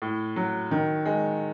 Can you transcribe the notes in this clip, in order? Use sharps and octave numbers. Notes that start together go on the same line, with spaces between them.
A2
F#3
D#3
G#3